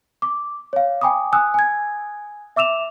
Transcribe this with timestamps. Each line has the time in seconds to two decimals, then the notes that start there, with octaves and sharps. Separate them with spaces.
0.22 D6
0.73 C#5 F5
1.01 G5 G#5 B5 D6 D#6
1.33 G#5 D#6 E6 F#6
1.54 G#5 G#6
2.56 E5 D6 E6 E7 F7